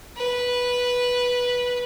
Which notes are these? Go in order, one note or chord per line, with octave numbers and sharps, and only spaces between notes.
B4